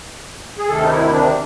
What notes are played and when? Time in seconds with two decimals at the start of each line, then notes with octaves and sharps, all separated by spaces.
0.58 G#4
0.69 D2 C3 D#3 A4
0.83 D#4
0.90 E4
1.11 D4